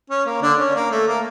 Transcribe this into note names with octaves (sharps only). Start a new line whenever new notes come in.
C#4
A#3
D3 D4
C#4
A#3
A3
A#3